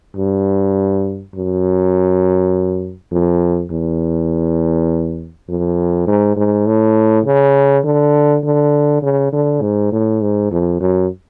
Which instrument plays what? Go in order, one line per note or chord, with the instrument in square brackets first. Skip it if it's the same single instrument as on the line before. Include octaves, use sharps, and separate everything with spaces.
[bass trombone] G2
F#2
F2
E2
F2
G#2
G#2
A2
C#3
D3
D3
C#3
D3
G#2
A2
G#2
F2
F#2